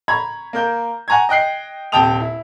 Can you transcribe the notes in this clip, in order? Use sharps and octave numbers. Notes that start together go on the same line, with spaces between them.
A#5 B5 C#6 G#6
A#3 A#4 G6
F#5 G#5 A#5 C#6 G#6
D#5 G5 F#6 C7
D#1 C3 G5 A5 D#6 F7
E4